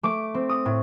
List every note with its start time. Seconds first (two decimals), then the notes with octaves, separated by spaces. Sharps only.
0.03 A3 D6
0.34 C4
0.49 D#6
0.65 A2